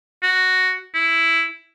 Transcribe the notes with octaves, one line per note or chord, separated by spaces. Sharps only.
F#4
E4